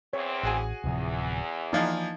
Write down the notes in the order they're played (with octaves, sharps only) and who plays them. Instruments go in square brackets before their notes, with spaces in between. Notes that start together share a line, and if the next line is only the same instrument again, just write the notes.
[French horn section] E2 C4 [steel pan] C#5
[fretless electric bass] A1 [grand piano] F#4 G#4 G#5
[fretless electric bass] D1 C3 F3 [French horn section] E2
[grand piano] E3 F3 D4 [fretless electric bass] A#3 [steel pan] D#4 F5